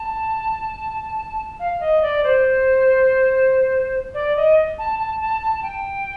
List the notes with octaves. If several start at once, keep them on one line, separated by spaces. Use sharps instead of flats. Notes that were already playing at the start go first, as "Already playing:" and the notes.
Already playing: A5
F5
D#5
D5
C5
D5
D#5
A5
A5
A5
A5
G5